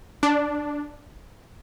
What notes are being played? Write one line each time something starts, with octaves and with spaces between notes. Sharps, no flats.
D4